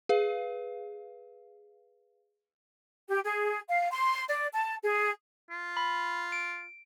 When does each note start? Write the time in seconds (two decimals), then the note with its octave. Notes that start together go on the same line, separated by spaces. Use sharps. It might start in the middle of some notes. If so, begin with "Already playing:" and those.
0.09 G#4 B4 F5
3.09 G4
3.24 G#4
3.68 F5
3.92 C6
4.30 D5
4.53 A5
4.82 G#4
5.50 F4
5.77 B5
6.32 D7